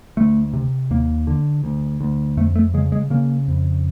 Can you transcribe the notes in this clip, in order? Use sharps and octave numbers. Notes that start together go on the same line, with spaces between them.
D2 A3
C3
D#2 A#3
D3
D2
D2
F2 A3
A3
C#3 G#3
G#3
C#3 A#3
F2